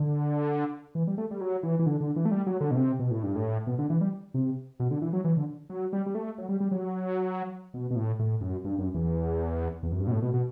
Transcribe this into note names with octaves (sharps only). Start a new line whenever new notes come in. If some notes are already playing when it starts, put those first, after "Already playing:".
Already playing: D3
E3
G3
A3
G3
F#3
E3
E3
D3
D3
E3
A3
G3
F#3
D3
B2
C3
B2
A2
G2
A2
B2
D3
E3
G3
C3
B2
D3
E3
F#3
E3
D3
F#3
G3
G3
A3
F#3
G3
G3
F#3
B2
B2
A2
A2
F#2
G2
F#2
E2
E2
F#2
G2
B2
A2
B2
B2